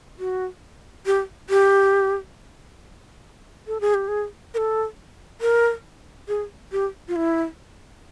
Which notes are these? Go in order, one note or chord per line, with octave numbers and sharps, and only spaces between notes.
F#4
G4
G4
A4
G#4
G4
G#4
A#4
A4
A#4
G#4
G4
F4
E4